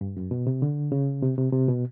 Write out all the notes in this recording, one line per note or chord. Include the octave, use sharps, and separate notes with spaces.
G2
F#2
B2
C3
D3
C#3
C3
C3
C3
B2